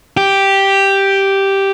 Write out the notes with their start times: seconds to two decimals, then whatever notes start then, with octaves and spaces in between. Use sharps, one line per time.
0.17 G4